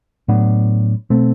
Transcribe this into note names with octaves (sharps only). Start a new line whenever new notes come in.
A2 F#3 B3 D4
B2 A3 C4